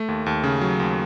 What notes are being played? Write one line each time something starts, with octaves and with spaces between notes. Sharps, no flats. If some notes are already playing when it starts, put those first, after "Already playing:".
Already playing: A3
D#2
D#2
C#3
F#3
D#2